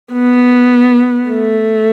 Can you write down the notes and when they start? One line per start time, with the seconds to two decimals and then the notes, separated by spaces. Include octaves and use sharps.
0.13 B3
1.30 A3